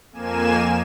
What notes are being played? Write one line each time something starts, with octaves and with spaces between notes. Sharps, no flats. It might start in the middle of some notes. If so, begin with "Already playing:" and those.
F2 A#3 G#5 E7